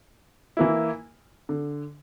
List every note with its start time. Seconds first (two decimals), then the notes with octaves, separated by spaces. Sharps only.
0.57 E3 A#3 E4
1.49 D3